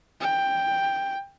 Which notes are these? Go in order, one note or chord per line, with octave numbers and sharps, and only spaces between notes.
G5